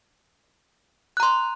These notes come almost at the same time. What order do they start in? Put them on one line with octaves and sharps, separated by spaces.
F#6 A#5 C6